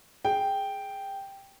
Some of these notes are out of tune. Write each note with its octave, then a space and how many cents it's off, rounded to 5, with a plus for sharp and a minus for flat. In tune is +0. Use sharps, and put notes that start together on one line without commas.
G#4 +5 G5 +0